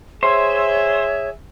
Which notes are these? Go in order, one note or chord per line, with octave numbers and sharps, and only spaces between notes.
G#4 C5 C#5 E5